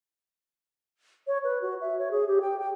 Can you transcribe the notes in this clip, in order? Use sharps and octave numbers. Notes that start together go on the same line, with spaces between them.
C#5
B4
F#4
E5
C#5
G#4
G4
G5
G5